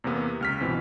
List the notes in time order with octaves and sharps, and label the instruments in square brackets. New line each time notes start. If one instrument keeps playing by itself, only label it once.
[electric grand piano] E2 C3 A#3 B3 B4
C#2 F6 B6
G1 B2 E3 C4